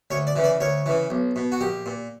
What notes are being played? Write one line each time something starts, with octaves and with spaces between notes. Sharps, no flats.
D2 C#5
D5
C#3 E3
D5
D2 C#5
C#3 E3
B1
B2
F#4
A#1 G4
A#2